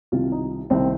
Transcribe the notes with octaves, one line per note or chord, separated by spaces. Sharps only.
C2 C3 D#3 F4
D#4
C2 C3 D#3 C4